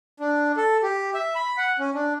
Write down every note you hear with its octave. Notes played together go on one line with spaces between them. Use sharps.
D4
A4
G4
E5
B5
F#5
C#4
D4